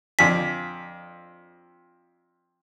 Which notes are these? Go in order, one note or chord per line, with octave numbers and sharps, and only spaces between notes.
F2 D4 G#5 B6